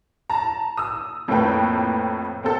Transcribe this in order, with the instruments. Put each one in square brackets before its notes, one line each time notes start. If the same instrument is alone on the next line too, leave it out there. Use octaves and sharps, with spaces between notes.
[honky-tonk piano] A5 A#5
D#6 E6
F2 A2 A3 A#3 B4 G5
A#3 C4 A4